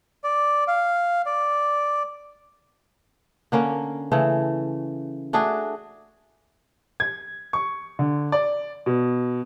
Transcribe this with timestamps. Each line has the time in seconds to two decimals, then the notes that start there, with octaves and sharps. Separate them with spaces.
0.24 D5
0.68 F5
1.26 D5
3.52 D3 A#3 C#4
4.12 C#3 E3 A3
5.33 A3 D4 F#4 G#4
7.00 G#6
7.53 C#6
7.99 D3
8.32 D5
8.86 B2